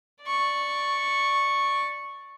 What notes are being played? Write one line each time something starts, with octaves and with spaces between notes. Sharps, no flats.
D5 C#6